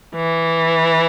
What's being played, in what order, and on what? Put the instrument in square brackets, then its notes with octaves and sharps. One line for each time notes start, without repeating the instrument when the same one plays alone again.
[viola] E3